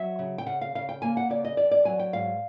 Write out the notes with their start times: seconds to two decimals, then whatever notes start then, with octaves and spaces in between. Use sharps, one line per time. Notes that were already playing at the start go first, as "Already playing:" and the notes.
Already playing: F#3 E5
0.19 C#3
0.38 G5
0.46 C#3 F#5
0.61 F5
0.75 C#3 F5
0.89 G5
1.02 A#3 G#5
1.17 F#5
1.30 C#3 D5
1.45 D#5
1.57 E2 D5
1.71 D5
1.85 F#3 G#5
1.99 G5
2.13 G#2 F5